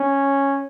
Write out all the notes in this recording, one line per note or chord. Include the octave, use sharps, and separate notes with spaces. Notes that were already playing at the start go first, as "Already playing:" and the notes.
Already playing: C#4